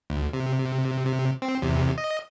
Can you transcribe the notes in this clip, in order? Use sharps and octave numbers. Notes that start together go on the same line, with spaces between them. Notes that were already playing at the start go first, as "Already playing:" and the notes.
D2
C3
C3
C4
E2 C3
D#5